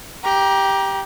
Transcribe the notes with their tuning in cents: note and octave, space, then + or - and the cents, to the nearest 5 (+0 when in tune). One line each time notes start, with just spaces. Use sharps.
G4 +0 A#5 +25